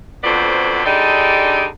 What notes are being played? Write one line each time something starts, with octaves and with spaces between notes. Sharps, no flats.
F2 D3 F#3 B3 C5 D5
D3 G3 D4 D#4 G4 G#4